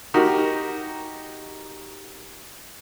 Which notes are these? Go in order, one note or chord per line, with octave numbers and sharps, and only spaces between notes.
D#4 F#4 G4 A#4